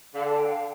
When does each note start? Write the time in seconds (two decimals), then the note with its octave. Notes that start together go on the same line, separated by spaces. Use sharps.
0.15 D3 F5
0.26 A5
0.37 G5
0.49 F5